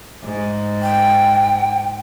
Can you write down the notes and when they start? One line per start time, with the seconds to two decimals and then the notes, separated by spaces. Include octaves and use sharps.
0.24 G#2
0.82 G5